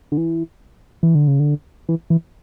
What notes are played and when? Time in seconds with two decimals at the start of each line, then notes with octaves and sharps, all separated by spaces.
0.12 D3
0.17 E3
1.03 E3
1.15 D3
1.28 C#3
1.40 D3
1.89 E3
2.10 E3